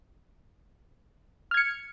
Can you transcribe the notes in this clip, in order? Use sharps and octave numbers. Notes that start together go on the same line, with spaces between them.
F6 G#6 C#7